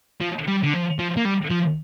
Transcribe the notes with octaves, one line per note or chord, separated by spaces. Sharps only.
F3
G3
D3
F3
F3
A#3
G3
F3